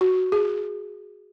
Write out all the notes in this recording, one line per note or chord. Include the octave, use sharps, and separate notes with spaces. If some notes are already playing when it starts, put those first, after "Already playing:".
F#4
G#4